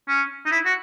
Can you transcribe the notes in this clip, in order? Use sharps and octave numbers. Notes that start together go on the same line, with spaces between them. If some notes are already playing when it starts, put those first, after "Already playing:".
C#4
D#4
E4
F#4